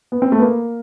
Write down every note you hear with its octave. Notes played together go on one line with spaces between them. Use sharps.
B3
C4
A3
B3
A#3